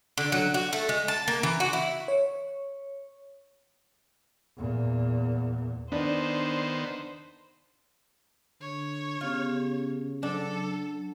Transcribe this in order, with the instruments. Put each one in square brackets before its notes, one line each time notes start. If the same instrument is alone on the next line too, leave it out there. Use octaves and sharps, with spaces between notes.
[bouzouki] D3
F#3
F#4
A3
G#3
A5
A#3
E3
F#4
E4
[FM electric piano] C#5
[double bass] E2 A#2
[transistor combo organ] D#3 B3 [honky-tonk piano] D4 [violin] C5
[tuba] D3 [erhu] C#5
[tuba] C#3 [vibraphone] B3 C#4 G4 [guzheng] F4
[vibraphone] F#3 [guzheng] D4 [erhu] A4